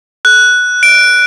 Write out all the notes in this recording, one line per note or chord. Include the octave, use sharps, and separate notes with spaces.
F#6
D7